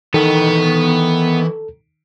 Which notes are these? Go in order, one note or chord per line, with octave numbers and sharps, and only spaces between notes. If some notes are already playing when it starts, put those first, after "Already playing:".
D#3 E3 B3 A4 G5